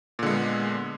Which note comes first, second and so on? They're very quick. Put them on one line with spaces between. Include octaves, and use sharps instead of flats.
A#2 D3 G#3 B3